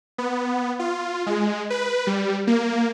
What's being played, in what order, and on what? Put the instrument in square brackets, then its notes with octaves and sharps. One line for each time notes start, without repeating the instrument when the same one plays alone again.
[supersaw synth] B3
F4
G#3
B4
G3
A#3